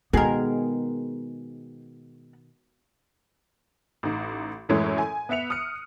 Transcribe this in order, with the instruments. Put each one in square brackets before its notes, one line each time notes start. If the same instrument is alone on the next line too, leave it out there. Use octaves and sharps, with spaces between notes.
[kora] B2 D#3 G#3 [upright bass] B3 [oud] G#4 A#4
[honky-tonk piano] A1 D#4
F#2 A2 E3 G#3 A3 C#4
G#5
B3 B4 E5 C#7 F7
D#6 F6 F#6 C#7